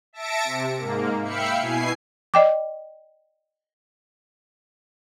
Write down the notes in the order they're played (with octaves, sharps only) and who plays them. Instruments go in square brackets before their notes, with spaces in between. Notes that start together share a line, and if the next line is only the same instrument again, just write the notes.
[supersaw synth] E5 A5 A#6 C#7 D7
C3
G#2 A#3
E5 F5 G5 B5 C#7
B2 E4 G#5 C7
[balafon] D5 D#5 G5 D6